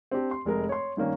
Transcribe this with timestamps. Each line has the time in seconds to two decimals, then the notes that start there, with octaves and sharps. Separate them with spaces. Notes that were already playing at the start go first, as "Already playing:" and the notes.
0.11 C4 D4 G4
0.31 C6
0.45 F1 G#3 A#4 A#5
0.69 C#5 C6
0.97 G2 D#3 A#3 C#4